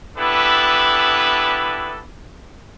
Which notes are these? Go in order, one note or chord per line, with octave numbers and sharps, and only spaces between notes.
B3 D4 E4 G4 A4 B4